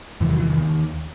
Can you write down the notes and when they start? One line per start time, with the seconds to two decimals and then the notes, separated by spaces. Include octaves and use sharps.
0.20 E2 C3 E3
0.29 D#3 F#3
0.40 E3
0.49 D#3
0.57 D#2